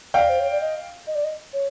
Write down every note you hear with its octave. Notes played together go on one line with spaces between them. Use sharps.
D5 F5 G5
C5
C#5
D5
D#5
D#5
D5
D#5
C#5